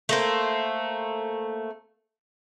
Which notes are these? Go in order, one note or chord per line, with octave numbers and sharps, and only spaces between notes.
A3 A#3 C5